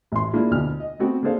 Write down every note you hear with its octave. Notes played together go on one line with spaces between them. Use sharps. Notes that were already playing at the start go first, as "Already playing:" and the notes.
A1 C6
G#3 A#3 D4 E4 F4
D2 B2 F6
D#5
A3 B3 C4 F#4
A#3 D4 G#4 A4 C5 F5